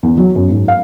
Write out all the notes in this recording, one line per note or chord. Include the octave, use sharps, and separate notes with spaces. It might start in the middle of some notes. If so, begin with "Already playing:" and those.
E2
F#3
F#2
G#2
F5